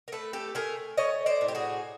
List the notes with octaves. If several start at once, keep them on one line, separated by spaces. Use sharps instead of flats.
A#4
A3 A4 B4
G4 A4
A3 G#4 A#4
A3 C#5 D#5
C5 D5
A2
G4
F#4 G#4